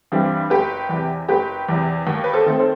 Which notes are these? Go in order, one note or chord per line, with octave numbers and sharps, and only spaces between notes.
G2 E3 G3 C4
F#1 G4 B4
E2 C3
F#1 G4 B4
E2 C3
D#2
B4
A4 C5
D#3 A3 C4
A4 C5